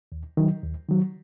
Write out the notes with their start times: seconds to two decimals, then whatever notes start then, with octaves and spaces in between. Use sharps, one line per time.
0.12 D#2
0.37 D#3 F#3
0.63 D#2
0.89 D#3 F#3